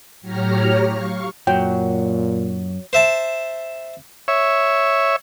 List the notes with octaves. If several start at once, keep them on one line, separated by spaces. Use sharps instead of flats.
A2 F#3 G4 C#5 A#5 F6
F5 C#6
F#2 A#2 F#3 G5
C5 E5 A5
C#5 E5